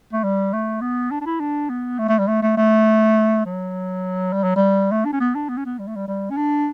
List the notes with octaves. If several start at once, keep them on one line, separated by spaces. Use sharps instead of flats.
A3
G3
A3
B3
D4
D4
E4
D4
B3
A3
A3
G3
A3
A3
A3
F#3
G3
F#3
G3
A3
D4
C#4
B3
D4
B3
C#4
B3
G3
A3
G3
G3
C#4
D4